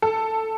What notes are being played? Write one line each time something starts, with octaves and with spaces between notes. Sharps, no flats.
A4